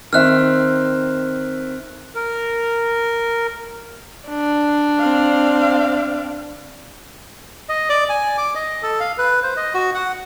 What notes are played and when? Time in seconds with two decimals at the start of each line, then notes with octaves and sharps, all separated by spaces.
0.13 D#3 C4 E5 F6 F#6
2.15 A#4
4.28 D4
4.99 C4 F5
7.69 D#5
7.89 D5
8.09 G#5
8.38 D6
8.55 D#5
8.83 A4
9.00 F5
9.18 B4
9.43 C5
9.57 D#5
9.74 F#4
9.95 F#5